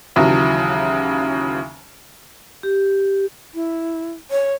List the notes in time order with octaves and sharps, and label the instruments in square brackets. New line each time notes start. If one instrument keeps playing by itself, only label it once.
[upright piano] D#2 C#3 E3 F#3 E5
[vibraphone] G4
[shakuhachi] E4
C#5